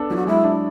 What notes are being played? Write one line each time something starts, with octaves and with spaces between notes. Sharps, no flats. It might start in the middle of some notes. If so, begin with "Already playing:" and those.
Already playing: B3 D4 A4
F#3 E4
F#4
G#3 E4
D4